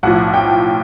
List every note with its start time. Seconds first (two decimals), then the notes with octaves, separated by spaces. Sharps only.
0.03 B1 A2 F3 F#5
0.34 G5